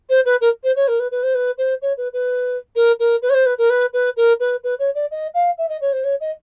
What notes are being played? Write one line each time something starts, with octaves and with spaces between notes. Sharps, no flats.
C5
B4
A#4
C5
C#5
A#4
B4
B4
C5
B4
C5
C#5
B4
B4
A#4
A#4
B4
C#5
C5
B4
A#4
B4
B4
A#4
B4
B4
C#5
D5
D#5
F5
E5
D#5
C#5
C5
C#5
D#5